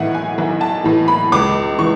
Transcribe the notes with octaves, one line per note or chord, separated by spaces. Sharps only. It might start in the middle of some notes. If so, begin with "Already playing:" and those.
Already playing: B1 A2 E3 E5 F#5
G#5
B1
A5
A2 E3
B5
C#2 D6
E3 C#6